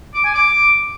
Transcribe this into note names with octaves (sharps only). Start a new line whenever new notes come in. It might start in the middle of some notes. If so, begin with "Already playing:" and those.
D6
G#5
D6